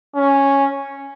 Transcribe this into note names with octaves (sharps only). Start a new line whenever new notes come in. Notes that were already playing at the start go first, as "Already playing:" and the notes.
C#4